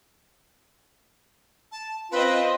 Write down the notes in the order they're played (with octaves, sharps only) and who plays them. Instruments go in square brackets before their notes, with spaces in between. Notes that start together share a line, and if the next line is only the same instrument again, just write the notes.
[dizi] A5
[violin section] C4 C5 D#5 [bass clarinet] F4 [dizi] B4